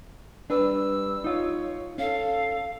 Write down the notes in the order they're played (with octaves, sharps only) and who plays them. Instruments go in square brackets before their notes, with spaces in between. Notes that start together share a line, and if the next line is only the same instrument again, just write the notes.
[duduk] G3 [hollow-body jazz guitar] D4 B4 [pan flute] E6
[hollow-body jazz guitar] D#4 F4 [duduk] C#5
[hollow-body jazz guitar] C#4 [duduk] A4 [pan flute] F5